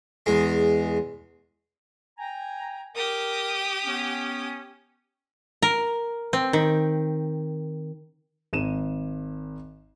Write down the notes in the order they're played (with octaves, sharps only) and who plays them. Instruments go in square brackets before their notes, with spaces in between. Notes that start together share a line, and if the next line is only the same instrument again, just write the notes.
[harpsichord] E2 G#3
[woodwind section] G5 G#5 A#5
[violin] G4 D#6 [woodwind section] A#4
[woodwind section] B3 C#4
[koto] A#4
C4
D#3
[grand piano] G#1 D#7 E7